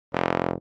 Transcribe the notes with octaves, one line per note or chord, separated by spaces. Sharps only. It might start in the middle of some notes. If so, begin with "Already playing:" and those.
F1